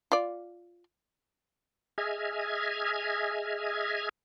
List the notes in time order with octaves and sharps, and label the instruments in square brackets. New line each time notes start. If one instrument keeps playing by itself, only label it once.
[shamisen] F4 D5
[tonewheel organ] G#4 D#5 E5 F6 G#6